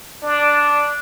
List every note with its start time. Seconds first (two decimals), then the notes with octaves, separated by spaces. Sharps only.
0.23 D4